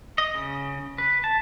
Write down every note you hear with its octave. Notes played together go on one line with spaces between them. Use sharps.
D#5
C#3
B4
A5